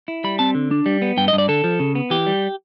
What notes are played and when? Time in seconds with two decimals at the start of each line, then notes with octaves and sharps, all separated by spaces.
0.08 E4
0.24 G3 B5
0.39 C4 A5
0.55 D3
0.71 D4
0.86 G3
1.02 B3
1.17 G2 G5
1.28 D#5
1.33 G2
1.38 D5
1.48 D3 A4
1.64 F3
1.80 C#3
1.95 B3
2.10 E3 G4
2.27 G3